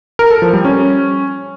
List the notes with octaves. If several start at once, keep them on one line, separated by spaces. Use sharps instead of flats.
A#4
A4
F3
G3
C#4